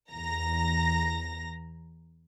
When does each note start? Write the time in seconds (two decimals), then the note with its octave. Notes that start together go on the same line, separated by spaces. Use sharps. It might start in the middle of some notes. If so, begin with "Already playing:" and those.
0.12 E2 A#5 A#6